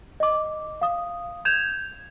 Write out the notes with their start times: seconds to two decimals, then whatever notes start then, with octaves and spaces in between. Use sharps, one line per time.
0.20 D#5 D6
0.81 F5 D#6
1.45 G6 G#6 E7 F7